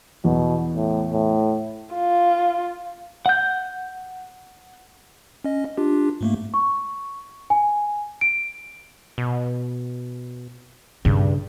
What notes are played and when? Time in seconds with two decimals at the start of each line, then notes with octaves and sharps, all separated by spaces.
0.24 E2 B2
0.76 A2
1.13 A2
1.94 F4
3.26 F#5 G6
5.45 C#4 D#5
5.78 D4 F4 G4
6.21 G#2 A3 A#3
6.54 C#6
7.50 G#5
8.21 D7
9.18 B2
11.05 G2 C#3 D4